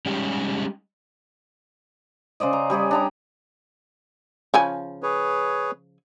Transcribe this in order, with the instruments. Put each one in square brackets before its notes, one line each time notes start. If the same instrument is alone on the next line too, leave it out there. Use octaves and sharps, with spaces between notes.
[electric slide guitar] G3 G#3 C#4 D#4 G4
[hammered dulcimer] C#3 C5 D5 D#5
A#5
G3 G4 G#4 C#5
D4 A#5 B5
[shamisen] C#3 F3 G#5
[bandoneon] G#4 B4 C#5